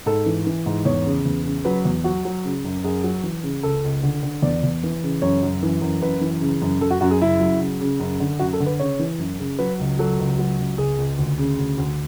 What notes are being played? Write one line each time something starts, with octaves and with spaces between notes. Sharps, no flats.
G#2 A4
E3
E3
G#2
E2 C#5
C#3
E2
C#3
F#3 B4
E2
F#3 F#4
F#3
C#3
F#2
F#2 G#4
F#3
E3
C#3
C#2 A4
C#2
D3
D3
E2 D5
E2
E3
C#3
F#2 C#5
F#2
E3
F#2
F#2 B4
E3
C#3
F#2
F#2 A4
F#4
F#2 F#4
G#4
C#3 E4
F#3
C#3
C#3
F#2
D3
F#2 F#4
A4
D3
B4
C#3 C#5
E3
F#2
C#3
F#3 B4
C#2
F#3 A4
C#2
F#3
C#2
C#2 G#4
C#2
D2
C#3
D2
D2